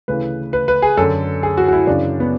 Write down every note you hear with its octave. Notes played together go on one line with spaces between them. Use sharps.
D2 C#3 E3 B4
B4
B4
G#4
F#2 D3 A4
G#4
F#4
F#4
E4
F#2 C#3 E3 D4
B3